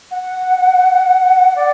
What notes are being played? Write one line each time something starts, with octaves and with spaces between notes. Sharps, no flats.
F#5
D5